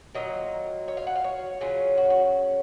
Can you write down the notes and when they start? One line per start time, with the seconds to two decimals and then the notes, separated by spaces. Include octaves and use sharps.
0.15 D#3 F#3 A#3 F4 D#5
0.88 C#5
0.97 F5
1.07 F#5
1.15 F5
1.24 C#5
1.61 C#3 F#3 C#4 F4
1.98 F#4
2.10 F#4